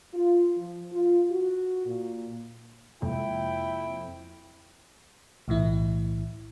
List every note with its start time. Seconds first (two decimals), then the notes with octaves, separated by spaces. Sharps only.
0.14 F4
0.57 F3
0.92 F4
1.31 F#4
1.86 A#2
3.02 F2 C3 G#3 A#3 E4 G5
5.48 B1 A2 E3 E4